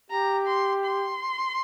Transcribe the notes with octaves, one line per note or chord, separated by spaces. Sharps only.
G4 A#5
C6
C6